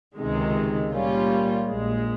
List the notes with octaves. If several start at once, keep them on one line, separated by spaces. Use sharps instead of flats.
C#2 C3 D#3 G#3
A#2 G3 A#3 C#4 F4
A#1 A#2 G#3